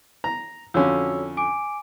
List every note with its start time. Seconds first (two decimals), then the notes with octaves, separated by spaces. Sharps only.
0.24 A#5
0.74 F2 D3 C#4 F#4 C#5 E6
1.37 G#5 D6 D7